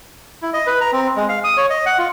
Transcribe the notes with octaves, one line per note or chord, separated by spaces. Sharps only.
E4
D#5
B4
A#5
C4
G#3
F5
D#6
C#5
D#5
F#5
F4